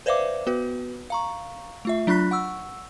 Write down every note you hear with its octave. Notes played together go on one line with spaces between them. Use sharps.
B4 C5 D5 E5 F5 D6
B3 F#4 B4
F5 A#5 C#6
A3 F4 E5
F#3 D4 F4 B5 F#6 B6
F#5 C#6 E6